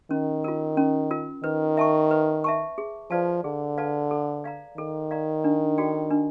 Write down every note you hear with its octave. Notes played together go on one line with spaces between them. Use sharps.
D#3 C#4
F4 A#4
C#4
F4 A#4
D#3 B4
E5 A5 C#6
B4
E5 A5 C#6
G#4
F3 B4 D5 F5 A5
D3 G#4
B4 D5 F5 A5
A4
D5 F5 A#5
D#3 A4
D5 F5 A#5
D4
F#4 A4 D5 G5
D4